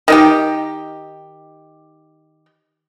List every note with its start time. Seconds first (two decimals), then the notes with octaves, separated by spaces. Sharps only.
0.08 D#3 D#4 G4